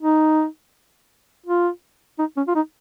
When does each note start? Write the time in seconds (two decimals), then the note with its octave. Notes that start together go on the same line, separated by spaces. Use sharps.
0.01 D#4
1.46 F4
2.19 D#4
2.37 C#4
2.48 F4
2.55 D#4